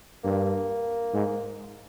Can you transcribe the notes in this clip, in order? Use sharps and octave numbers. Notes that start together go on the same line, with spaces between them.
G2 A#3
G#2